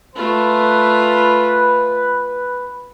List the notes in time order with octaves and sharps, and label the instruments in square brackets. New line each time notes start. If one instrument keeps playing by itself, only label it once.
[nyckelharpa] A3 F4 [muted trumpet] B4